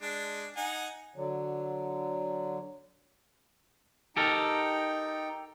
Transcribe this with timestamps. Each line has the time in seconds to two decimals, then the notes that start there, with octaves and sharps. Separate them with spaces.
0.02 G#3 D4
0.57 D#4 F#5 G#5
1.16 D3 F#3
4.17 D#4 G4 A4 A#4 G5